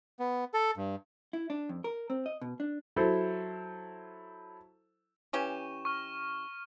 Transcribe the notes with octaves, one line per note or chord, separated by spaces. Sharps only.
B3
A4
G2
E4
D4
F2
A#4
C4
D#5
B2
D4
F#3 E4 A4 C5
E3 C#4 G4 C#6 E7
C#6 F6